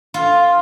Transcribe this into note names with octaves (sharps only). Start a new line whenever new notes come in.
F4